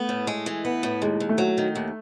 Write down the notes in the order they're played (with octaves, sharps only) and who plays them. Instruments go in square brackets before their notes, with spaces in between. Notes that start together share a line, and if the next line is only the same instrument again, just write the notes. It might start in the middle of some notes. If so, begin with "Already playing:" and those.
Already playing: [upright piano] A3 [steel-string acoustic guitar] B3
[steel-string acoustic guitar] A2
G#3
E3
B3
A2
[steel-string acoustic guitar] D#2 [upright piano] G#3
[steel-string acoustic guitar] D#2
[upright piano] A3
[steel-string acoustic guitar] F#3
D#3
D#2